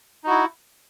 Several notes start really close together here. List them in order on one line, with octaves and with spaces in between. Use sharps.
D#4 F#4 E4